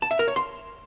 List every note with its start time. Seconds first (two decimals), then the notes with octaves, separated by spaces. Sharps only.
0.02 A5
0.11 E5
0.19 A#4
0.28 C#5
0.36 C6